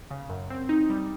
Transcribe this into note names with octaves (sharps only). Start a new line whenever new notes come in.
C#3
F#2
C4
D#4
G3